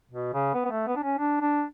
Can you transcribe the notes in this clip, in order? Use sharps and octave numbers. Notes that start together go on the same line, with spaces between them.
B2
C#3
B3
B3
A3
B3
D4
C#4
D4
D4